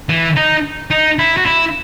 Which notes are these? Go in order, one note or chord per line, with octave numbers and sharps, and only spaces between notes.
E3
D#4
D#4
E4
F#4
E4